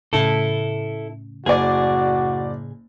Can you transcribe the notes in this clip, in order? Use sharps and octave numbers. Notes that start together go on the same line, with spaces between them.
A2 C#3 E4 A4
F#1 F#4 G#4 D5